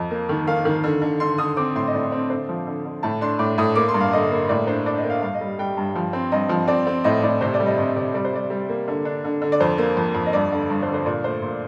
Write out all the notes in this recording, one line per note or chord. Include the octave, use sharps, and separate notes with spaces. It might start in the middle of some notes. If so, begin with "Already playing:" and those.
Already playing: F2 D#5
A#3
D#3
D#3 F5
D#3
D3
D3
D3 C6
D3 D#6
C4 D6
A2 C6
D#5
A2 D5
C4
D3 C5
F3
D3
D3
A2 A5
D4 C6
A2 D6
A2 D#6
A#3 D6
C6
G2
F5
D3 D#5
A#3
A2 D5
D4 C5
D4 D5
D#5
A#3
F5
G2 F5
D#5
G3
G3 G5
G2
F3
C4
G2 D#5
F3
C4 D5
C4
A2 D#5
A2 D5
C3 C5
D5
G3
D#5
C3 D#5
C3 D5
G3 D5
C5
G3 D5
G3
A#3
D3
D4
D3
D3
D5
F2 C5
A#3
F2
F2
D#5
G2 D5
D3
G2
C5
D3
C5
A#2 D5
A3 C5
A#2